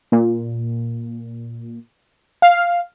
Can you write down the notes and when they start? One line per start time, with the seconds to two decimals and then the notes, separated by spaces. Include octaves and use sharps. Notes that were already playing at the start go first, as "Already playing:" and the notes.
0.12 A#2
2.42 F5